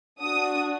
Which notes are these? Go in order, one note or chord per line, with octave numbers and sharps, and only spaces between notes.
D4 F#4 D#6